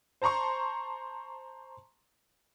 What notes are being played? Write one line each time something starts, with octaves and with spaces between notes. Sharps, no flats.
C5 A5 A#5 C6 C#6